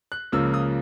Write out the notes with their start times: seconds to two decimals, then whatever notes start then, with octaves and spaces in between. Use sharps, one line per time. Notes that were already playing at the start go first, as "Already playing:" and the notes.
0.12 F#6
0.32 C#2 C#3 F3 A#3 E6
0.54 D#6